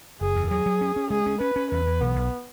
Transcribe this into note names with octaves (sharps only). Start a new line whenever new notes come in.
F#1 G#4
E2
F#3 G#4
F#3
C#4
C#4
G#3 G#4
C#4
C#4 B4
C#4
E2 B4
E3
B1 B3
B1